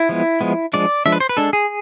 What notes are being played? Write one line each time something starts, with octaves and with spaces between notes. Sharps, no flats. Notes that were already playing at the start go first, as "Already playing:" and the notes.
Already playing: E4
F3 G#3 B3
F3 G#3 B3
F3 G#3 D4 D5
F3 G#3 D4 E5
B4
C5
B4
G#3 D4 A4
G#4